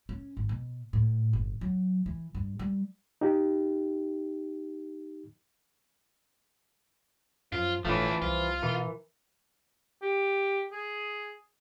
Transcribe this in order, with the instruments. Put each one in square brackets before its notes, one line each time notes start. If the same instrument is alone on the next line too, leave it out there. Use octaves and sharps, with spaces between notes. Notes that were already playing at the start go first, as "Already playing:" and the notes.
[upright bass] C#4
G#1
B2
A2
G1
F#3
E3
G2
G3
[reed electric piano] D#4 G4
[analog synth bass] F#2 [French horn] F3 [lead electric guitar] F4
[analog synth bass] G1 [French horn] A2 [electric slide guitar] E3 F3 [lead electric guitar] A3 D4
[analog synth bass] C2 [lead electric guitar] F4 [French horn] C5
[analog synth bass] B2 [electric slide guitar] E3 [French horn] A#4
[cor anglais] G4
G#4